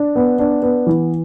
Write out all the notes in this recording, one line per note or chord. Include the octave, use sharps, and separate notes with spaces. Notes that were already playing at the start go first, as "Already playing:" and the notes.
Already playing: D4
B3
D4
B3
E3